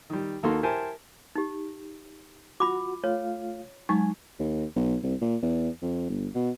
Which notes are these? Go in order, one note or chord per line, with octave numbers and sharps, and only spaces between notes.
D#3 G3
D#2 D#3 A#3 F#4 A4 C6
E4 G4 A#4 C5 G#5 A5
D#4 G4
F4 F#4 B5 D6
A3 F4 C#5 F5
F#3 G#3 D#4 G#5 C#6
D#2
B1
C2
A#2
E2
F2
G1
B2